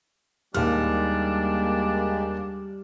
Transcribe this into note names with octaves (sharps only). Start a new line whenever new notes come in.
D#2 G3 G#3 A#3 D4 G4 F6